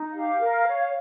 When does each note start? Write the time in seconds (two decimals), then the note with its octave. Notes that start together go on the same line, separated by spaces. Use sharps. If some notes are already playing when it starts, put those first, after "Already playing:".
Already playing: D#4
0.14 G4 F5
0.40 A#4
0.66 C#5